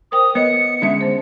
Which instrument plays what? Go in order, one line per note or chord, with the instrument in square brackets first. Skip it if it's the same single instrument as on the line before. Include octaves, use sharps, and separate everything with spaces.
[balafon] A#4 C5 G5 [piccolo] D#6
[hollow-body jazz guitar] B3 [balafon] B4 C#5 D#5 [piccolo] C#7
[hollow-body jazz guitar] D3 G#3 [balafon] C#4 E5
[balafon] B3 C5